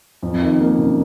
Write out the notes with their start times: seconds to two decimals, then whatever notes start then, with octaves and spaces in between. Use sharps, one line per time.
0.23 F2
0.41 D#3
0.60 A#3
0.78 F#1